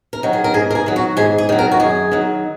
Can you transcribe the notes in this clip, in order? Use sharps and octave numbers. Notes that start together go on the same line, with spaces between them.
A#4
D#3 F#3
G#4
A#4
G#2 G#4
A#4
G#4
D#3 F#3
F#4
G#2 G#4
G#4
D#3 F#3
A#4
F#4
F#2 G#4
D#3 F#3